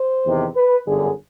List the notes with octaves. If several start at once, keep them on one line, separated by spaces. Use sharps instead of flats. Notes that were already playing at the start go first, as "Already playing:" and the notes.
Already playing: C5
E2 C3 D#3
B4
G1 F#2 D3 G#4